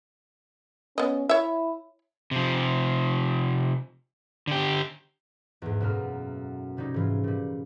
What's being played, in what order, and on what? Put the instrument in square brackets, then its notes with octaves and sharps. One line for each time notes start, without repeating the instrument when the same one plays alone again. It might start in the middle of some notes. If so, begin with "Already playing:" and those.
[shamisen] B3 D#5 [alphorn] C#4
[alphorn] E4 [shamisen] C#5 E5
[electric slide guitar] C3 F3
D3 G4
[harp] E2 G#2
F#2 B2 A3 A#3 F6
C3 G3 C#4 D#4
G#2 E3 F4
A#2 G3